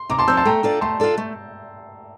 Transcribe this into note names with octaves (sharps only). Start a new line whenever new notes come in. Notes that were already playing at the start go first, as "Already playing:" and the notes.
Already playing: C6
C3 A#5 D6
A5 C6
F3 C4 E6 G6
A5 C6
A3 G5 A#5
D4 F4 A4 D5
A3 A5 C6
D4 F4 A4 D5
A3